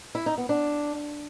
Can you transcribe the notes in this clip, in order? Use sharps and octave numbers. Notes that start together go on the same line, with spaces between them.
E4
D#4
B3
D4